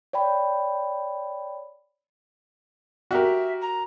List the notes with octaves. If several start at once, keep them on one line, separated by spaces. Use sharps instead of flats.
C#5 D5 G5 B5
F#4 G4 A#4 E5
A#5